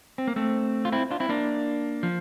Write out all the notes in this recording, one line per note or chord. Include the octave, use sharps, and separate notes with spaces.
C4
A#3
A3 C4
F4
C4 E4
D4 F4
C4 E4
A#3 D4
F3